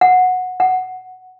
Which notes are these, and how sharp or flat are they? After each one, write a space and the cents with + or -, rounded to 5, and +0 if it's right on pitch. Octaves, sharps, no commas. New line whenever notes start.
F#5 -10
F#5 +5